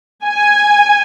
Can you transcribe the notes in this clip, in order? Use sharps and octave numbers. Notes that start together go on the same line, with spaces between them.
G#5